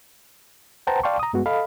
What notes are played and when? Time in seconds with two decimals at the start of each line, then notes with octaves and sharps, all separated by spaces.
0.87 B4 C5 F#5 G5 A5 A#5
1.03 D5 F5 G5 A5 C6 C#6
1.19 A#5 D#6
1.33 G2 G#3 B3 F#4
1.46 A4 D#5 F5 B5